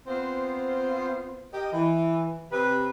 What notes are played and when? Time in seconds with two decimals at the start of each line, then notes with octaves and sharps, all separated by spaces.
0.07 B3 C4 F4 C5
1.53 G4 A#4 D#5
1.73 E3
2.52 C3 B4